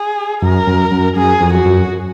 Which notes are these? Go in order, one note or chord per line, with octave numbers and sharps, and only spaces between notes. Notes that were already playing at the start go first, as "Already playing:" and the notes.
Already playing: G#4
F#2 A#4
F#2
F#2
F#2 G#4
F2
F#4
F#2